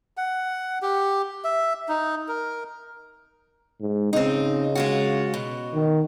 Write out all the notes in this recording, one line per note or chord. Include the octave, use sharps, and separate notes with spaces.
F#5
G4
E5
D#4
A#4
G#2
C#3 C4 D#4
G#3 F4 F#4
B2
D#3